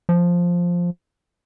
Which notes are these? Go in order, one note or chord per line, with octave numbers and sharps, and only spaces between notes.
F3